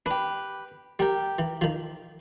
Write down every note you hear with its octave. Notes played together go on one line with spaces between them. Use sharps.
D4 G4 B4
G3 G4 A#4 G5
E3
D#3 F3